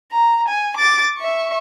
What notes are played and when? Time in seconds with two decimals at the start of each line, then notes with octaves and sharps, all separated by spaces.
0.12 A#5
0.48 G#5
0.77 D6 A6
1.18 E5 C#6